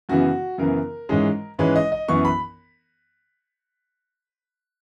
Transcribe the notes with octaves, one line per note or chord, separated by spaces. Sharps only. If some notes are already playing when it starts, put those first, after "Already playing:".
F#2 C#3 E3 B3 F#4
F#2 C#3 E3 B3 A#4
G#2 E3 G#3 C#4
G#2 E3 G#3 C#4 B4
D#5
D#5
F#2 E3 B3 C#6
B5